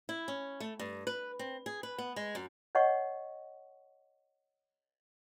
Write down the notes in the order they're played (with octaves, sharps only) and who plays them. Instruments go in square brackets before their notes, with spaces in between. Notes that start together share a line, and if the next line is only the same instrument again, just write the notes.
[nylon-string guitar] E4
C#4
A3
G2
B4
C4
G#4
B4
B3
G#3
F#2
[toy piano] C#5 D#5 F#5 C#6